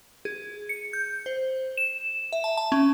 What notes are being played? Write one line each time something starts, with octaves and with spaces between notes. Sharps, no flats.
G#4
C#7
G6
C5
E7
E5
A5
A5
C#4